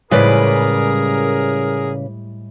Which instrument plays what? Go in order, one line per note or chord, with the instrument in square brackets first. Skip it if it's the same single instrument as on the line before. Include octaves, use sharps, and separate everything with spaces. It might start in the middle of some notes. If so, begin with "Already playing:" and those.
[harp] A2 G3 G#3 [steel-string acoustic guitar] C#3 B4 D5 [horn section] G#4 A#4